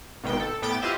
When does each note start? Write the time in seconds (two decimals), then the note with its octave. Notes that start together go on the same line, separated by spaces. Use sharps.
0.24 G#1 B2 D#3 G5
0.40 A4
0.62 A2 B3 G5 D6 A6
0.82 E4 F4 G4 C5 D#5 E5